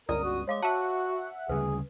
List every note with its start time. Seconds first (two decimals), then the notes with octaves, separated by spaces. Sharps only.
0.09 G1 C#2 A#4 D5 D#6
0.24 F#4
0.48 G#3 C#5 F5 D6
0.63 F#4 E5 F#5 A5
1.49 D2 C#3 G3 G#4 B4